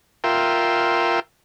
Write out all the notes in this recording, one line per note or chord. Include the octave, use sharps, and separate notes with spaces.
F4 A#4 E5 G5 C6